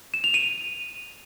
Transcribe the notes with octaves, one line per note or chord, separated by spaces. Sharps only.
E7
F7
D#7